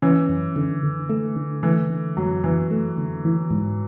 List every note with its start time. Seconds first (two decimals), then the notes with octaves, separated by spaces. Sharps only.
0.02 E3 C#4
0.29 F#2
0.56 D3
0.83 D3
1.10 A3
1.36 D3
1.63 E3 A3
1.90 D3
2.17 F#2 F#3
2.44 F#2 E3
2.71 A3
2.98 D3
3.25 E3
3.51 G#2